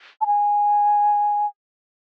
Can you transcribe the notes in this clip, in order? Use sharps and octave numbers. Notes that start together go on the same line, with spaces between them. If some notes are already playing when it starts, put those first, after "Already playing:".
A5
G#5